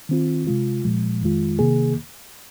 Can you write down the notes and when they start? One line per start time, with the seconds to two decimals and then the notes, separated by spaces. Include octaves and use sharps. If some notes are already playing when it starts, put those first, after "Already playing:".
0.09 D#3 C4 F4
0.47 C3 G#3 F4
0.84 A#2 F3 G#3
1.21 F2 D#3 G#3 F4
1.59 C3 D#3 A#3 G#4